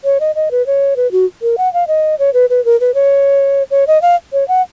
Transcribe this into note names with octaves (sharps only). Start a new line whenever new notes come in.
C#5
D#5
D#5
B4
C#5
B4
F#4
A#4
F#5
F5
D#5
C#5
B4
B4
A#4
B4
C#5
C#5
D#5
F5
C#5
F#5